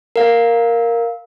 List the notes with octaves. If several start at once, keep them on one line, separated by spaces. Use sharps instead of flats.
A#4 F5